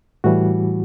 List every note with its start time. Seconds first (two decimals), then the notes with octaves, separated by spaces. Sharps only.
0.24 A2 E3 G3 F#4